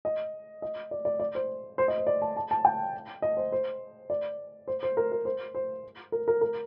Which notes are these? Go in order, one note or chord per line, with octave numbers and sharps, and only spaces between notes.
D#5
D#5
D5
D5
D5
C5
C5
D#5
C5
D5
A5
A5
A5
G5
D#5
C5
C5
D5
C5
C5
A#4
A#4
C5
C5
A#4
A#4
A#4